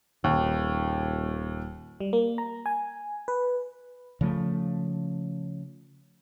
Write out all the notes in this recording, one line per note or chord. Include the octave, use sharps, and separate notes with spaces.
D#1 D#2
G3
A#3
A#5
G#5
B4
C#3 F3 A3